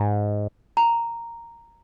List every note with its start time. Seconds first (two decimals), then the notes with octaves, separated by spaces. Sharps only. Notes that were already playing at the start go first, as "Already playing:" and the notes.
Already playing: G#2
0.77 A#5